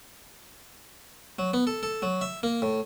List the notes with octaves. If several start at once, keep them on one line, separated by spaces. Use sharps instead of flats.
F#3
B3
A4
A4
F#3
E5
A#3
A2